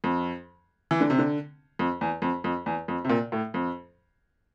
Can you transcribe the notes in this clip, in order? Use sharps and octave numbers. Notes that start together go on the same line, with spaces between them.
F2
E3
D3
C3
D3
F2
E2
F2
F2
E2
F2
C3
A#2
A2
F2